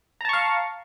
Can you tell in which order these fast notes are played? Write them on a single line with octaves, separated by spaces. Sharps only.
A#5 A5 C#6 F5